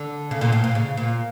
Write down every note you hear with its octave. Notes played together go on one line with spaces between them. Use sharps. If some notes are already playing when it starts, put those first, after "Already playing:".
Already playing: D3
C#3
A#2
A2
A#2
C#3
A#2